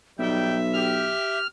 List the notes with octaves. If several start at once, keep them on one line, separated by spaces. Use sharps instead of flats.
B1 G3 D#4 E5 G5
G4 F6